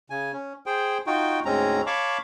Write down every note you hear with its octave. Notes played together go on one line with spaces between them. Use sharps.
C#3 G#5
C#4
G#4 C5 G5
D#4 F4 F#4 G5
D2 G#2 G#3 C4 C#4 A#5
C#5 F5 A5 B5 C#6 D6